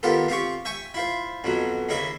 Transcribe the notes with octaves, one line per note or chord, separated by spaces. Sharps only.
D#3 B3 F4 G4 A4
C4 F4 G4 C#6
E5 G5 G#5 C#6
E4 F4 C5
F2 B2 F#3
D#2 C#3 E4 D#5 E5